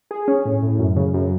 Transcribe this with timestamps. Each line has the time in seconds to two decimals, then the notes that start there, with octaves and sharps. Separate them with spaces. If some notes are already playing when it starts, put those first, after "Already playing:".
0.11 G#4
0.28 C#4
0.45 A2
0.63 A2
0.79 F#2
0.96 C#3
1.14 F#2